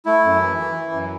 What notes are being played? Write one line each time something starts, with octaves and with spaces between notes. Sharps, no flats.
A3 E4
F#2
E3
E3
E3
F#2